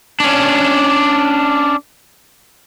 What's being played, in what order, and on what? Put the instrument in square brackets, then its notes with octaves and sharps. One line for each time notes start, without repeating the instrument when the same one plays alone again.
[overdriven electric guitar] C#4 D4